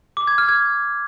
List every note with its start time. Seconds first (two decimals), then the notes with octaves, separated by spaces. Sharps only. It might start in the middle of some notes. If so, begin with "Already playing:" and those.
0.17 D6
0.27 G#6
0.38 F6
0.49 G#6